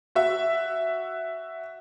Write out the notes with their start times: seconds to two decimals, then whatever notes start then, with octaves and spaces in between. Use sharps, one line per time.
0.15 F#4 E5